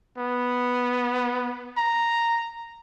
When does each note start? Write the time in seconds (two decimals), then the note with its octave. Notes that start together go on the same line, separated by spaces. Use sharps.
0.18 B3
1.77 A#5